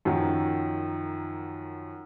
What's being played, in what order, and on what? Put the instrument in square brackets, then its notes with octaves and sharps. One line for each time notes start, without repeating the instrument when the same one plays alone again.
[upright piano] F#2 D#3 F3 F#3